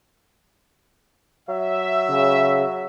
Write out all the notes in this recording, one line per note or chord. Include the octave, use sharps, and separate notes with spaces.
F#3 E5
C#3